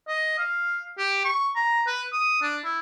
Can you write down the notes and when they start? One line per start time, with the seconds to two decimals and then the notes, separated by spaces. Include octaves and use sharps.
0.08 D#5
0.38 F5
0.98 G4
1.25 C#6
1.55 A#5
1.87 B4
2.12 D#6
2.42 D4
2.64 E4